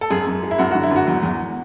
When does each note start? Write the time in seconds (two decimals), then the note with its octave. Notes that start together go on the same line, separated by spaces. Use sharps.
0.01 A4
0.10 F#2 G#4
0.27 F#2
0.43 G#3
0.51 E4
0.58 F#2 F#4
0.71 F#4
0.75 D3
0.83 E4
0.91 F#2 F#4
1.07 E2
1.23 E2